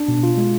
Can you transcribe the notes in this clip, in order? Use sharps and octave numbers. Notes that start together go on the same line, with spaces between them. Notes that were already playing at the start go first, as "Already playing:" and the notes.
Already playing: D4
B2
F4
G#3